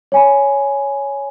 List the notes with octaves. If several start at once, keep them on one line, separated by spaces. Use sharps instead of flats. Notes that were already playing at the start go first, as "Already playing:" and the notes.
C#5 G#5 B5